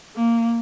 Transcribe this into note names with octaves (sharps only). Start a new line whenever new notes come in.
A#3